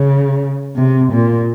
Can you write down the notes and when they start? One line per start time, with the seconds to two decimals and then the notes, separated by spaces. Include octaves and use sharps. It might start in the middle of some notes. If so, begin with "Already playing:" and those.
Already playing: C#3
0.76 C3
1.12 A#2